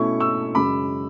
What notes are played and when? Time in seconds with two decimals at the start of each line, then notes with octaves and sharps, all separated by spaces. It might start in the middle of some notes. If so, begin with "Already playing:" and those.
Already playing: B2 A3 C#4 E4 C#6
0.20 C#6 E6
0.55 F#2 C#3 G#3 B5 D6